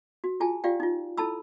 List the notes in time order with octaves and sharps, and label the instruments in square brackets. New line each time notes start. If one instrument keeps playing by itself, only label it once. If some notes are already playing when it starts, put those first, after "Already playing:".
[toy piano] F#4
F4 G#4 G#5 A5
F4 G4 D5 F5 G5
D#4 F4
E4 A4 A5 B5 E6